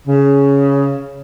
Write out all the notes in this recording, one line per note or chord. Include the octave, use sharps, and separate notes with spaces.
C#3